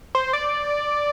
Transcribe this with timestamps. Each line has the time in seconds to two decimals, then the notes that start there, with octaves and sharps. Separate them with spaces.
0.15 C5
0.33 D5